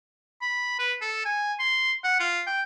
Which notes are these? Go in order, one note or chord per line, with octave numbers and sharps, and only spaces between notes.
B5
B4
A4
G#5
C6
F#5
F4
G5